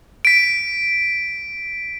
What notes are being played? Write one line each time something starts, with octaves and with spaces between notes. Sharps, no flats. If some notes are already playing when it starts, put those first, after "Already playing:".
B6 D7